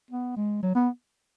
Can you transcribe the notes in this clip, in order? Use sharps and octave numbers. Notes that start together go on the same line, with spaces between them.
B3
G#3
F#3
B3